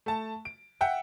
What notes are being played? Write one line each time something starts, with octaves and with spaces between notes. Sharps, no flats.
A3 A5
D7
E5 F#5 G5